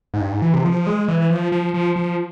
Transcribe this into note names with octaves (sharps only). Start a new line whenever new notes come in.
G#2
G2
G#2
E3
C3
F3
G#3
E3
F3
F3
F3
F3